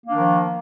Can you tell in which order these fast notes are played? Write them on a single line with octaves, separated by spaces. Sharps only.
A#3 D4 D#3 F3